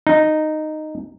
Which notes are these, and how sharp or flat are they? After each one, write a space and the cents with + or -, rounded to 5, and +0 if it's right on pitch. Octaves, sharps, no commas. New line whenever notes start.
D#4 -10